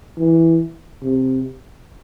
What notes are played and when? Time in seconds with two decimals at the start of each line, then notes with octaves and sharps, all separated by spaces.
0.18 E3
1.02 C3